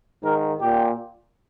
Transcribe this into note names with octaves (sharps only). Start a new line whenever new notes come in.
G#2 D#3 A#4
A#2 G4